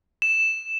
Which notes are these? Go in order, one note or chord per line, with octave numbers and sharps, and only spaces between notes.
E7